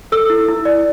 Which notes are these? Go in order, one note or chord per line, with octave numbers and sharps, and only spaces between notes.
A4 E6
E4
E4
D5